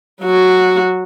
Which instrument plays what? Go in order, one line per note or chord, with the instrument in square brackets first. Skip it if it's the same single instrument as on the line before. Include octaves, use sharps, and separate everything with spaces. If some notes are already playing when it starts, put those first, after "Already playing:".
[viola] F#3 F#4